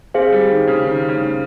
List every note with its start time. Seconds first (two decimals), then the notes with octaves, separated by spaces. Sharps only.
0.14 C4 G#4 C5 F5
0.32 G3
0.50 D#3
0.67 C#3
0.86 D#3
1.00 D#3
1.09 C#3